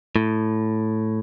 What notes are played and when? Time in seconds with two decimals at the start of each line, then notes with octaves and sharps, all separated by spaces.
0.16 A2